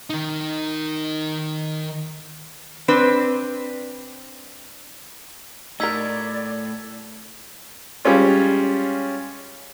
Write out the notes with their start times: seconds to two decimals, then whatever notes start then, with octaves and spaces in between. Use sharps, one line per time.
0.10 D#3 D#4
2.88 C4 D4 B4
5.80 A2 D#4 A#4 D5 E6 G#6 B6
8.05 G3 G#3 C#4 F4